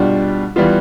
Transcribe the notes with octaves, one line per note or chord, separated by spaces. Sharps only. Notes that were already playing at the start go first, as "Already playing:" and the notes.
Already playing: B2 G3 D4 F4
E3 G3 B3 F4